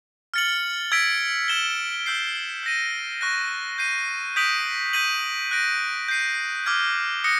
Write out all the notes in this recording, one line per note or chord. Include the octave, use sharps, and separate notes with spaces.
F6 A6 C#7 F#7
E6 G#6 B6 D7 F#7
G#6 B6 E7 G7
E6 G6 C7
G6 A#6 D#7
C#6 F#6 A#6
G6 C7 D#7
D#6 G6 B6 D7 F#7
G6 B6 D#7 F#7
F#6 A#6 D7
G6 C7 D#7
D6 F6 G#6
D#6 F#6 A#6 C#7